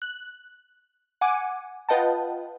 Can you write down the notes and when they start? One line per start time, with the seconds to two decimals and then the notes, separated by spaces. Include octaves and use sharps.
0.02 F#6
1.21 F#5 G#5 D6
1.89 F4 B4 D#5 F#5 G5 A5